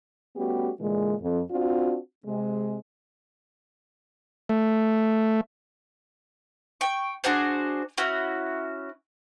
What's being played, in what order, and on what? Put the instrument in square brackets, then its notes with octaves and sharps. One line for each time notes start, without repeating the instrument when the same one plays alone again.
[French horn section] G3 A3 B3 C#4 F#4 G4
A#2 D3 E3 G#3
F2
C4 D4 F4 F#4
C3 G#3
[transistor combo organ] A3
[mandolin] G5 C#6
D4 F#4 G#4 C5
C#4 E4 F#4